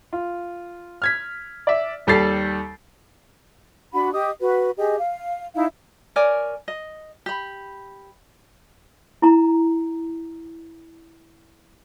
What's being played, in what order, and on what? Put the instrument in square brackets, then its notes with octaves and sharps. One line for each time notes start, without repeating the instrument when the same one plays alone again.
[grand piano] F4
F6 G#6 B6
D5 E5
D#2 G3 G4 A4 A6 C7
[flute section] D4 F#4 F#5 B5
G4 D#5 D#6
F#4 B4
G4 G#4 D#5
F5
D#4 E4 F5
[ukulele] A#4 C#5 D5 G#5
D#5
G4 B5
[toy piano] E4 A#5